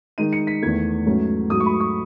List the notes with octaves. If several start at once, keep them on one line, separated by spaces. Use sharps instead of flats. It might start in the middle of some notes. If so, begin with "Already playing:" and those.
D#3 G#3 D#4 D#7
C#7
B6
E2 D#3 A3 G#6
G#2 F#3 A3 C#4
G#2 F#3 A3 D#6
C#6
B5
C#6